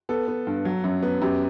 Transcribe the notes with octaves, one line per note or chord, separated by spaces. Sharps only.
B3 A4
B3
G2
F#3
F#2
B3
F#2 G4